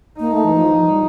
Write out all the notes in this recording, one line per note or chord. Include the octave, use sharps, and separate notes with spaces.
A#3 D#4
A3
E3
F3
G3